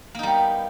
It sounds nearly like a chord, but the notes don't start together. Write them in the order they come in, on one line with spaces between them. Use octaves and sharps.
A#3 D#4 G3 B3